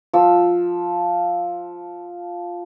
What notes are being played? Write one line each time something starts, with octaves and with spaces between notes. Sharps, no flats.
F3 E6